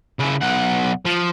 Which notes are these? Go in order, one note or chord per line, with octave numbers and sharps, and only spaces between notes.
C#3 E4
B1 F#5
F3